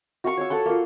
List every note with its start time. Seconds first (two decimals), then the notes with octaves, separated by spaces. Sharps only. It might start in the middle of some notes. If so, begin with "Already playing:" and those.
0.24 F#4 F5 C#6
0.37 C#5 D6 E6
0.50 A4 F#5 C6
0.66 A#3 F4